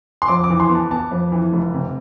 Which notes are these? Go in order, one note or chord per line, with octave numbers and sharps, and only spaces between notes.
C6
F2 D6
D6
E3
C6
B3
A5
B3 A5
F2
E3
F1
C3